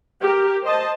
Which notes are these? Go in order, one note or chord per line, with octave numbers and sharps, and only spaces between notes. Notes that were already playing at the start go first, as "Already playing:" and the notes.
G4 A#4
C5 D#5 A5